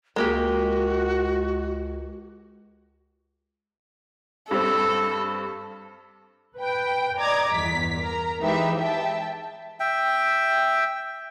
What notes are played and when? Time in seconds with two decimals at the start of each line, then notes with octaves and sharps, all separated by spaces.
0.16 C#2 G#3 A#3 F#4 G4
4.51 G2 G3 C4 A4
6.57 B4 G5
7.18 D5 D#5 A#5 D6 G#6
7.51 G1 E2 B6
7.98 A#4 A#5
8.40 E3 G#3 D#4 G4 B4 E5
8.78 E5 G5 A5
9.80 E5 G5